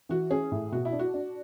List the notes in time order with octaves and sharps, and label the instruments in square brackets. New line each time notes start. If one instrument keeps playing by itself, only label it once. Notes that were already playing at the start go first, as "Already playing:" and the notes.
[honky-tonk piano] E3 [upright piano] F#4
[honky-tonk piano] C#4 [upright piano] G#4
[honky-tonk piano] A2
[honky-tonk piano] B2 [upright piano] F#4
[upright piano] E4
[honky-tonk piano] D4
[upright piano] F#4
[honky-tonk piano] D4